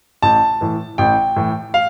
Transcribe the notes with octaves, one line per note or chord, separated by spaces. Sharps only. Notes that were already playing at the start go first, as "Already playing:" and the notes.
A1 A5
A2 E3
A1 G5
A2 E3
F5